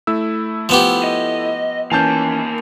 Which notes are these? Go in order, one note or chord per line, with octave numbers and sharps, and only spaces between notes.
A3 E4 E6
F3 B3 G4
D#5
D#2 E3 A#3 C#4 G#5 A5 G6